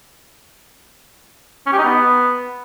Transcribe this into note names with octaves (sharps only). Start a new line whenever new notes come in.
C#4
G4
D#4
B3